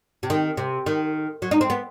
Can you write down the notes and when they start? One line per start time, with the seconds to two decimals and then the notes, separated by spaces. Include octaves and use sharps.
0.23 C3
0.30 D#3
0.57 C3
0.86 D#3
1.42 F#3
1.51 D#4
1.61 C4
1.70 B3